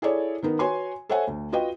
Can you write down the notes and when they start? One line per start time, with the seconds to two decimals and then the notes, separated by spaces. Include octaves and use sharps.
0.02 E4 G#4 A4 C#5 D5
0.42 D#3 B3 D#4 A#4
0.59 F#4 B4 C#5 G#5 C6
1.09 A4 C5 C#5 E5 F#5 G#5
1.27 D2
1.52 F4 F#4 B4 D#5 G5